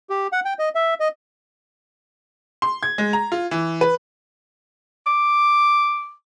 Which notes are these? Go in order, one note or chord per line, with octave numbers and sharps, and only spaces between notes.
G4
F#5
G5
D#5
E5
D#5
C6
G#6
G#3
A#5
F4
E3
B4
D6